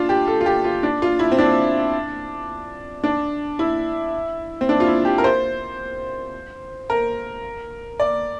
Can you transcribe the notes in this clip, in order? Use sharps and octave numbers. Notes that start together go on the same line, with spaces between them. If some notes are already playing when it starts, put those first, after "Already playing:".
Already playing: D4 F4
G4
A4
F4
G4
F4
D4
F4
E4
C4
D4
D4
E4
C4
D4
F4
E4
G4
A#4
C5
A#4
D5